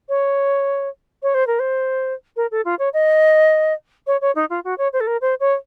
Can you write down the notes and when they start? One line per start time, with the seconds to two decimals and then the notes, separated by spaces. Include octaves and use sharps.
0.09 C#5
1.23 C#5
1.34 C5
1.47 A#4
1.59 C5
2.37 A#4
2.51 A4
2.65 F4
2.79 C#5
2.94 D#5
4.07 C#5
4.21 C#5
4.35 D#4
4.50 F4
4.64 F#4
4.78 C#5
4.93 C5
5.00 A4
5.07 A#4
5.21 C5
5.40 C#5